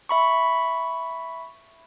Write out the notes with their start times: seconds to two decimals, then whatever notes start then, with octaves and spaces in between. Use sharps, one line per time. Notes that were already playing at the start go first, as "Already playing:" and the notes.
0.09 E5 B5 C#6